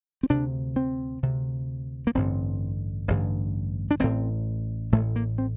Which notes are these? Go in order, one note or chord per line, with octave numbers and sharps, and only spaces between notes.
C4
D2 C3 D4
C4
D2 C3
A#3
A1 G2 D3 C4
A1 G2 D3
D4
A1 A2 C4
A1 A2 A3
A#3
C4